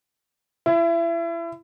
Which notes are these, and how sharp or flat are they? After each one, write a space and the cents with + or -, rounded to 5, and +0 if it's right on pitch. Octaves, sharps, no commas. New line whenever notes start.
E4 +30